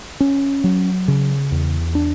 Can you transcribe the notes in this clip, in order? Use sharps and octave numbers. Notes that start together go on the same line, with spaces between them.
C#4
F#3
C#3
E2
D4